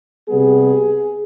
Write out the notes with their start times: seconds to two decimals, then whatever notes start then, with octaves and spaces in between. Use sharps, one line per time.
0.29 C3 G3 B3 G#4